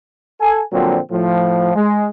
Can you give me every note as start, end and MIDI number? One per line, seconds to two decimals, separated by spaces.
0.40 0.61 69
0.40 0.61 80
0.72 0.98 46
0.72 0.98 50
0.72 0.98 53
0.72 0.98 54
0.72 0.98 60
1.11 1.75 45
1.11 1.75 53
1.75 2.07 56